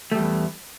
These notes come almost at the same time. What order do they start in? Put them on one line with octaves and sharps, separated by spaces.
A3 G3 E2